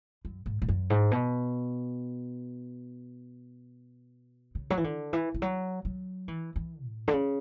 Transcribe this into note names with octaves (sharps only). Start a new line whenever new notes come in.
F#2
G#2
G#2
F#2
G#2
B2
C#3
F#3
E3
D3
E3
E3
F#3
F#3
E3
E3
A2
D3
C#3